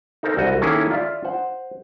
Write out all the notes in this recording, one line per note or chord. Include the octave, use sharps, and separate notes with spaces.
D#4 A4 A#4 C5
C2 F#4 D#5
D#3 A#3 C#4 E4 G#4 A4
F4 D5 E5 F5
C5 F#5